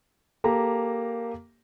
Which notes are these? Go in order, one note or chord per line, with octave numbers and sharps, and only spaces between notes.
A#3 G4 A4 A#5